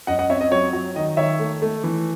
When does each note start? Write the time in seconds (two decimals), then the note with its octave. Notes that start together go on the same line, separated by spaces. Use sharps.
0.07 F#2 D#5 F#5
0.19 D#5 F#5
0.30 C4 C#5 E5
0.41 D#5
0.51 F#3 C#5
0.73 F#3
0.95 D#3 D#5
1.17 D#3 C#5 E5
1.40 A3
1.62 A3
1.84 E3